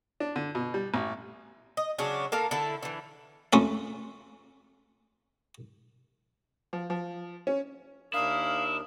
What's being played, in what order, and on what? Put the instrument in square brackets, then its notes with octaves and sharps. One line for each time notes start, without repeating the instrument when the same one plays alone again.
[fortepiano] D4
D3
B2
G3
A1
[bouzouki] D#5
C#3 F#3 C#4 D4
A#3 A4 A#4 F5
D3 E4 A4
D3 E3
[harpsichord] F2 A3 C#4 E5
[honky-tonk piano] F3
F3
C#4
[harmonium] D#2 D4 A#4 [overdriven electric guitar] E4 [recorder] F5 [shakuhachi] D#6